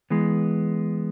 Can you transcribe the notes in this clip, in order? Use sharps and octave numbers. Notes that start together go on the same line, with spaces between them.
E3 G#3 B3